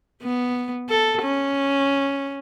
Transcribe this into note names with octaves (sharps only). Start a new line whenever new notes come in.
B3
A4
C#4